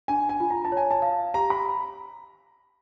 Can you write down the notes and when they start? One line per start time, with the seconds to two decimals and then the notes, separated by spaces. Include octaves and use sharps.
0.08 D4 G#5
0.29 G#5
0.40 F4
0.50 A#5
0.65 A5
0.72 C#5
0.77 G#5
0.91 A5
1.02 F5
1.34 G4 A#5
1.50 B5